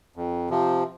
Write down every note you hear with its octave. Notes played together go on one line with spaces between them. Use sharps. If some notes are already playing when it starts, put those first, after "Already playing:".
F2
C3 F3